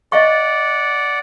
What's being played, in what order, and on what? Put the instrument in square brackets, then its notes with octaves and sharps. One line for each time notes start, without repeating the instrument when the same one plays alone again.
[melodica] D5 F#5 [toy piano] D#5 F5 C#6